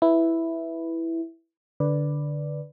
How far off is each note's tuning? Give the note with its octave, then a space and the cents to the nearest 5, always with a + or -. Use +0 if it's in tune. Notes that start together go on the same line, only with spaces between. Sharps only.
E4 +0 B4 +0
D3 +0 B4 +0 D5 +0